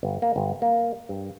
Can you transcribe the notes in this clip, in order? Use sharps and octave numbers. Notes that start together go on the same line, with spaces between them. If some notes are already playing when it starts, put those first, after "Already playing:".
G1
A#3
G1
A#3
G2